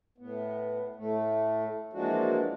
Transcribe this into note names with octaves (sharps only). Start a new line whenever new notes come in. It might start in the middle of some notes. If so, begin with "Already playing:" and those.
A2 B3
A2 A3
E3 F3 G#3 A#3 D4 F#4